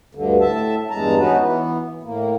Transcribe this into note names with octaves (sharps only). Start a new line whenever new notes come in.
D2 G2 D3
A2 E5 A5
E2 G2 G#3 A5 A#5
B3 C#4 D#4 F#4 B4
E3 B3
A2 A#3